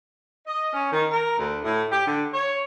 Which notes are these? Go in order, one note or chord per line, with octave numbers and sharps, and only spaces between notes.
D#5
C#4
D#3
A#4
D2
A2
G4
D3
C#5